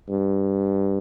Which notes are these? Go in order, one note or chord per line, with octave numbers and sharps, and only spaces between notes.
G2